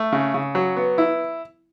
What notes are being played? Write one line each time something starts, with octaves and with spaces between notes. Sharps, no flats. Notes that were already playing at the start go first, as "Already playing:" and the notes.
Already playing: A3
C#3
C#3
F#3
B3
E4